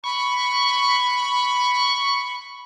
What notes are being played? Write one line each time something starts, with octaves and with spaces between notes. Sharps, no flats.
B5 C#6